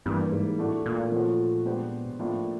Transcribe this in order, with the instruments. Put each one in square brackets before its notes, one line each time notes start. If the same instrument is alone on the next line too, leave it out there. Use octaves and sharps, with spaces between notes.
[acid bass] G2 [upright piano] E3 G3 A#3
[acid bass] G#2
[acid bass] A2 [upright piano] A3 D4 F#4
[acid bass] A#2
[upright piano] F3 A3 C#4 F#4
G#3 B3 D4 G4 C5
A2 F3 A#3 D4 F4